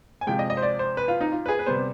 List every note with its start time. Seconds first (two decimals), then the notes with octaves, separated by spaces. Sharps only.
0.21 G#5
0.27 C3 F3 G#3 G5
0.39 D#5
0.50 D#5
0.57 C5
0.62 D5
0.79 C5
0.97 B4
1.08 F4
1.21 D#4
1.32 F4
1.46 B4
1.49 G#4
1.59 B4
1.66 C3 G3 B3 C5